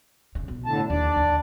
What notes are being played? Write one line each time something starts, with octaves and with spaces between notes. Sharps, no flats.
C#3
B2
A2 D3 A5
D#2 D4 D5
D#2 D3